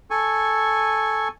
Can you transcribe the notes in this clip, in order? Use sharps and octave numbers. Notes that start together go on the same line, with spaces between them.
A4 G#5 C#6